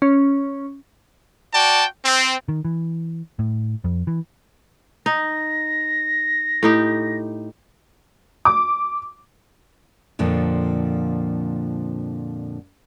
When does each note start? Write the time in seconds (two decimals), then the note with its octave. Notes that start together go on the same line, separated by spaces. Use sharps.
0.02 C#4
1.53 F#4 D5 G5 A5
2.05 C4
2.48 D#3
2.65 E3
3.39 A2
3.84 F2
4.07 E3
5.06 D#4 A#6
6.63 A2 D#4 G4
8.45 D6
10.19 F2 A#2 D3 F3